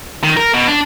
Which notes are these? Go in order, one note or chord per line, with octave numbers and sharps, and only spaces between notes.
D#3
A#4
B2
D4